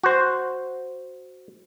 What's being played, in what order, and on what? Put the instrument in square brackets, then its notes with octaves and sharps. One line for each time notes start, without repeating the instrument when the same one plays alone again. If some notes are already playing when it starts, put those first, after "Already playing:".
[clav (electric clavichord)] F#4 C5